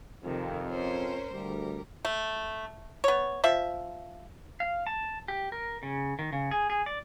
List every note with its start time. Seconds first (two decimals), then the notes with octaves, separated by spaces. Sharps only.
0.24 F2 C3 D#3
0.70 C#4 A#4 C5
1.33 D2 G3 A#4
2.05 A3
3.04 B3 C#5
3.44 F3 E5
4.60 F5
4.87 A5
5.28 G4
5.52 A#4
5.83 C#3
6.19 D#3
6.33 C#3
6.51 G#4
6.70 G#4
6.86 D5